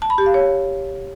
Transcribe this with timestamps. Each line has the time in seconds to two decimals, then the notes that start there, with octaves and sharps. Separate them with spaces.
0.02 A5
0.10 B5
0.18 G4
0.26 F5
0.34 C#5